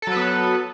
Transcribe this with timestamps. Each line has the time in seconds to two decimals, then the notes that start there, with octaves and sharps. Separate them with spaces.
0.02 A4
0.07 F#3
0.12 B4
0.17 B3